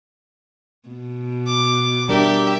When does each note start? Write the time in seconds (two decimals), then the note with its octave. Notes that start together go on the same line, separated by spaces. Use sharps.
0.89 B2
1.46 D6
2.09 G3 D4 G4 A#4 E5